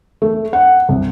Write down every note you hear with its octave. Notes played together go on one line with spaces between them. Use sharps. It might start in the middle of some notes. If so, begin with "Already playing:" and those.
A3
F#5
C2